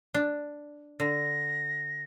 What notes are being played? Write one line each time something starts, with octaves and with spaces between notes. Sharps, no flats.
D4
D3 A#6